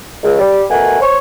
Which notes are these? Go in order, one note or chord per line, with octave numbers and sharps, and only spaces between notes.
C#2
G3
B2 A3 A#4 F#5 G#5
C5 C#5